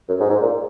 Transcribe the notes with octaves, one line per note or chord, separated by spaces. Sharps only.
F#2
G#2
G#2
A#2